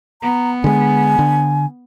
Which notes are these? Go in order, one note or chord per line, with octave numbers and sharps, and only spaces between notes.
B3 A#5
D3 G#3 G#5
D3